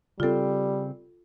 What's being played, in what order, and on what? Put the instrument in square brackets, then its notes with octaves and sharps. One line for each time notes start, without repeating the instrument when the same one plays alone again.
[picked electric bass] C#3 C4 [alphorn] G3 [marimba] F4 A4